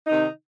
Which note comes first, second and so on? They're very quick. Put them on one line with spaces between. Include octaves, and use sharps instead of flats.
D#4 D#3 C3